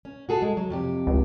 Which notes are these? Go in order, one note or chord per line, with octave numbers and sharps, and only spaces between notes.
C#4
F#4 G#4 A4
G#3
F#3
F2 C3 G4
C#2